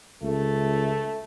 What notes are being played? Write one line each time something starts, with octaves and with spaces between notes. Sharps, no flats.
C#2 A3